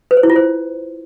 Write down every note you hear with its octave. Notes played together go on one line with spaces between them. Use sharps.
B4
C5
E4
F4
C5